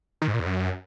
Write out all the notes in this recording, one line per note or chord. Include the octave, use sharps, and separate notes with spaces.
D#3
G#2
A#2
E2
F#2